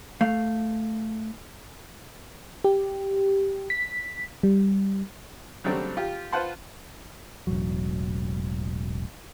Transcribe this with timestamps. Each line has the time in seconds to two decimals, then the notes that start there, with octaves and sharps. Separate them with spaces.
0.21 A3 F5
2.64 G4
3.70 B6
4.43 G3
5.64 C#3 F#3 G3 A3 C4 D4
5.97 F4 G4
6.32 F4 B4 C5 F#5 A5 C6
7.47 E1 A1 F2 F#3